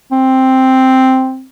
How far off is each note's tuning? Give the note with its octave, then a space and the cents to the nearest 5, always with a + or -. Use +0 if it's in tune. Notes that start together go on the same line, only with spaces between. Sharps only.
C4 +0